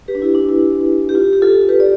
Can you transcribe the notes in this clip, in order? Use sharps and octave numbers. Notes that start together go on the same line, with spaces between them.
G4 B4
D4
E4
D4
E4
G4
F4
G4
F4 A4
G4 B4
D5